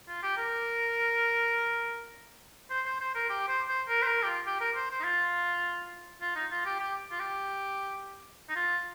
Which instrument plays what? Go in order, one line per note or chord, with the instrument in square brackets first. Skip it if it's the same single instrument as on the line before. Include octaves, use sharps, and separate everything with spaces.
[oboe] F4
G4
A#4
C5
C5
C5
A#4
G4
C5
C5
A#4
C5
A#4
G4
F4
G4
A#4
C5
C5
D#4
F4
F4
D#4
F4
G4
G4
F4
G4
D#4
F4